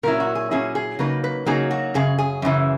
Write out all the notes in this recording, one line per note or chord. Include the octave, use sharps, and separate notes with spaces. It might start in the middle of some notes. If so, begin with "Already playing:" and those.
A#2 F#3 C#4 E4 A#4
F#4
G#4
A#2 F#3 C#4 E4 G#4
G#4
C#3 F#3 A#3 D#4 B4
B4
C#3 F#3 A#3 D#4 G#4
F#4
F#2 C#3 G#4
G#4
F#2 C#3 E3